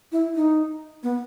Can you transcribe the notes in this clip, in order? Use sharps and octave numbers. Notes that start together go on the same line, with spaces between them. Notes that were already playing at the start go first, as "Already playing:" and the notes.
E4
D#4
B3